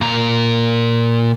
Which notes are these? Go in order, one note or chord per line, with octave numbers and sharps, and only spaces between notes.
A#2 A#4